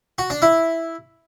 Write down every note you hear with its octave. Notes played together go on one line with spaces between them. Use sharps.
F#4
D4
E4